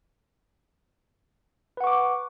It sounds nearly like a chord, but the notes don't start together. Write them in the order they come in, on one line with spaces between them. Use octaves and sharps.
B4 F#5 C#6 D6